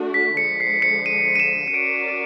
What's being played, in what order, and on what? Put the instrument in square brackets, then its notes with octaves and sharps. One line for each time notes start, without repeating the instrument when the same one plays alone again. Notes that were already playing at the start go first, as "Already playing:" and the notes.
Already playing: [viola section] A3 D4 F#4
[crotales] B6
[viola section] D3 F3 G#3 [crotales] C#7
[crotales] C7
C#7
D#7
D#7
E7
D#7
[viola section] C#4 F#4 A#4 D5 [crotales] D7
[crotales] D#7